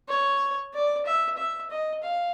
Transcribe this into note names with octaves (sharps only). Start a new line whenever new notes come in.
C#5
D5
E5
E5
D#5
F5